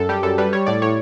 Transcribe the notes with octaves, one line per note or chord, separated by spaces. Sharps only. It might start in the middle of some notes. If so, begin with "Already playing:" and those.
Already playing: F#2 A4
G3 G4
F#2 A4
G3 B4
G3 C#5
A2 D5
A2 C#5